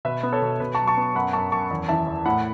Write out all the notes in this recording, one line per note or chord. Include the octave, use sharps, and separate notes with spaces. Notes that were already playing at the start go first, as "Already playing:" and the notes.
B2 B4 E5
B3
A4 C#5
B2
B2 B4
F#3 A5 C#6
A5 C#6
B3
F#2 F#5 B5
F#2 A5 C#6
F#2 A5 C#6
E2
E3 E5 A5
E2
A2 F#5 B5